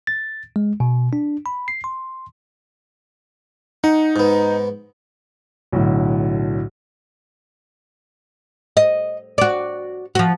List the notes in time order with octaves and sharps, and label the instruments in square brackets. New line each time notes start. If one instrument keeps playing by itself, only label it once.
[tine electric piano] A6
G#3
B2
D4
B5
C7
C6
[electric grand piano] D#4 [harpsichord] F#5
[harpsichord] G#2 B3
[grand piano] B1 A2 D3
[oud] D#5
F#4 D5
F3 F#4